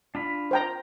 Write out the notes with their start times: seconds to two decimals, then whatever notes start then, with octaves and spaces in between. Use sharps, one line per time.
0.15 D4 F4 B5
0.51 C5 G5 A#5